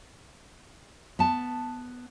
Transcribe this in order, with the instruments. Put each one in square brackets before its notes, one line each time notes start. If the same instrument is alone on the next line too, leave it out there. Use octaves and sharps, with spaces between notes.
[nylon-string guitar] B3 A5